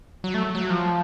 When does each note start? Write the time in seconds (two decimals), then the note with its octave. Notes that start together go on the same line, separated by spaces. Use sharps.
0.24 F#3
0.34 A3
0.55 F#3
0.70 F3